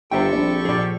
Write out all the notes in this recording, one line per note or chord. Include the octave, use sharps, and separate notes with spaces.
G1 G4 A4 C5 E5 G5 C#6
A#1 C4 D4
A#2 F3 G#4 D5